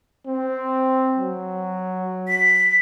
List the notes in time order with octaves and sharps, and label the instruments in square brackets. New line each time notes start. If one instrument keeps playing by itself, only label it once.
[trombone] C4
F#3
[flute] B6